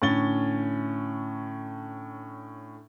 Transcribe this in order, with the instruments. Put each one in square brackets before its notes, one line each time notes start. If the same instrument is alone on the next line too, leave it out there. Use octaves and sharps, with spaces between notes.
[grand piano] A2 D3 C#4 A6 G7